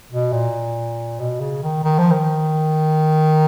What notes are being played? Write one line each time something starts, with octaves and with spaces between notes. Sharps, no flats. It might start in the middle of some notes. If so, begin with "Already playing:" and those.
B2
A#2
B2
C#3
D#3
D#3
F3
D#3